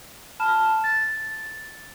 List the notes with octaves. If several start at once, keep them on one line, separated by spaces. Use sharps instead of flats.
A5 B5 F6 E7
A6